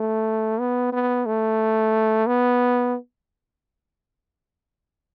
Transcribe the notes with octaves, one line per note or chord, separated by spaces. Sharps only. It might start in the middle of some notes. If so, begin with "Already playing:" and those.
Already playing: A3
B3
B3
A3
B3